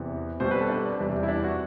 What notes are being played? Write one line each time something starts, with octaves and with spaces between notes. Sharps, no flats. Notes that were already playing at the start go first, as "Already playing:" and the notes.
Already playing: E2 C3 E3 B3
B2 G3 C4 C5
B4
A4
D4
E2 C3 G3
E4
D4
F#4